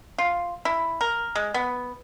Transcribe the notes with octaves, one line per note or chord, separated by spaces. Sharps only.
F4
E4
A#4
G#3
B3